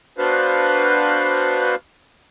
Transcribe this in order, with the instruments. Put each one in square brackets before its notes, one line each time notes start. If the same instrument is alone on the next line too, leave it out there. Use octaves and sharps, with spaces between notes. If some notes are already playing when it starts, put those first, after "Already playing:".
[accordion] B3 D4 F#4 B4 C5 F5